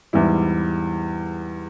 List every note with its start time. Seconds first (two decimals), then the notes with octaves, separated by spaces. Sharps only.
0.13 E2 G#2 G3 E4